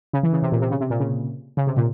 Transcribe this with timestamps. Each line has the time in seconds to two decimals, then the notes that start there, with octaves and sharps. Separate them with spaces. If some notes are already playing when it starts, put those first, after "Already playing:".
0.13 C#3
0.23 E3
0.33 C#3
0.43 C3
0.52 A#2
0.61 C3
0.71 C#3
0.81 C3
0.90 A#2
1.00 C#3
1.57 C#3
1.67 C3
1.77 A#2